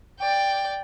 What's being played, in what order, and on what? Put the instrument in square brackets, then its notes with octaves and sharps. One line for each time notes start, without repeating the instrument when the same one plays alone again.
[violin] D5 G5